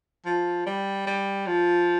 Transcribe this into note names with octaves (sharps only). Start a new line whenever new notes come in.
F3
G3
G3
F3